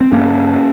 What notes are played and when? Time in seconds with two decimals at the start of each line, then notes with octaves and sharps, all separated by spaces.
0.01 C4
0.12 G2 A#3 C#4